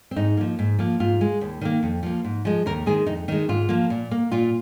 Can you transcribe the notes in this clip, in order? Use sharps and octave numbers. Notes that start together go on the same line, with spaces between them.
C4
G#2 D#4
F3 A#3
G#2
F3 A#3
G#2 F4
G#3
D#2
D#3 A#3
F2
F3 A#3
G#2
F3 G#3
D#2 A#4
D#3 G#3 G#4
F2 D#4
D#3 G#3 D#4
G#2 F4
F3 A#3
A#2
A#3
A#2 F4